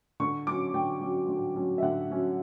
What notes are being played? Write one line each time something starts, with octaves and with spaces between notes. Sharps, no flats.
D3 C#6
F#3 C#4 D6
D3 G5
F#3 C#4
D3
F#3 C#4
E5
D3 F#5
F#3 C#4